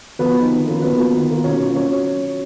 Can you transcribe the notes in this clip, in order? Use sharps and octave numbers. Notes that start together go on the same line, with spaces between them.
F3 B3 B4
B3 D#4
D#3
A#3 C#4 F4
F#3 B3 B4
A#3 F4
D#3
A#3 F4
B2 C#4 C#5
F#3 C#4 F4
F#3 C#4 C#5